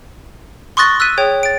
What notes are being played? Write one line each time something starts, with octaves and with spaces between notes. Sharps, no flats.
C6 C#6 D#6 F#6 A6 A#6
E6 F#6 A6 B6 D#7
G#4 C#5 G5
A6 D7